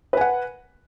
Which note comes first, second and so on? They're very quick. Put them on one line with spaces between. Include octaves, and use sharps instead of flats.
B4 G#5 F#5